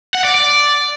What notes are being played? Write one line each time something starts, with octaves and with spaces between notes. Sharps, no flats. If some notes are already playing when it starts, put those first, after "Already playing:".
F#5
D5
D5